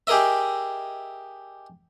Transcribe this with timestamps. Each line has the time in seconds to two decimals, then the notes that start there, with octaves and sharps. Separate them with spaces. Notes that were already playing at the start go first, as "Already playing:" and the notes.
0.07 G4 G#4 A#4 D#5 E5